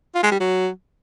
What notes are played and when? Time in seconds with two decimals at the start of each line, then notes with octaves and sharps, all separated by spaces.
0.15 F4
0.23 G#3
0.32 G3
0.40 F#3